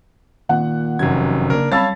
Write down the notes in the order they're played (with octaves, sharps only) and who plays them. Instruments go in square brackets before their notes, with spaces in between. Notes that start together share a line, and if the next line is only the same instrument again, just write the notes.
[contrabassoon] A#2 [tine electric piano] D#3 [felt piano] F#5
[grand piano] F1 C3 G#6 [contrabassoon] F#2
[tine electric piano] C#3 A#3 [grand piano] D4 A#4
[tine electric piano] F#3 G3 [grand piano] C#5 F5 A5 [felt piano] B5 E6 A6